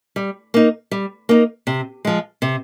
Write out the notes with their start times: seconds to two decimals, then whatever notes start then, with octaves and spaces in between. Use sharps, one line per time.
0.16 G3
0.54 A#3 D#4
0.91 G3
1.29 A#3 D#4
1.67 C3
2.05 F3 G#3
2.42 C3